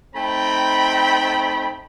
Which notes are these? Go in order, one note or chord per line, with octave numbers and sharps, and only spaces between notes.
A3 C4 D#4 G5 B5